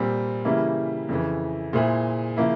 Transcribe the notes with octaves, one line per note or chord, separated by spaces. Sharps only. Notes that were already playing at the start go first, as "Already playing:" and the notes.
Already playing: A#2 G3 C4
C#3 E3 G3 A#3 E4
F2 C#3 E3
A#2 G#3 E4 G#4 C5
C#3 F3 A#3 E4